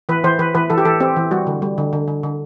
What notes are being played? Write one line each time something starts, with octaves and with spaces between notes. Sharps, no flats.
E3 B4
E3 C5
E3 B4
E3 B4
E3 A4
G4
E3 A4
C4 G4
E3
G3 F#4
D3
G3
D3
D3
D3
D3